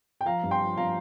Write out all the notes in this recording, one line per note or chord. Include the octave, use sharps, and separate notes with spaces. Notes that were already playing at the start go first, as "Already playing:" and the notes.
G5
F3 F5 A#5
G2
G5 C6
F3
F3 F5 A#5